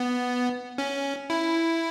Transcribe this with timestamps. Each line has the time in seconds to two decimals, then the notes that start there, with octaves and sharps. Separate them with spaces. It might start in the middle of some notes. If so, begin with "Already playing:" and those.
Already playing: B3
0.78 C#4
1.30 E4